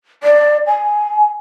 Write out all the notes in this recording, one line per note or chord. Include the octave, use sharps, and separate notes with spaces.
D5
G#5